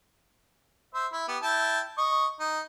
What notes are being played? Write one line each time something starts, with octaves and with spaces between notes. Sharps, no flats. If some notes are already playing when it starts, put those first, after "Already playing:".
C5 E5
E4 B5
B3 G4
E4 G5 A5
D#5 C#6
D#4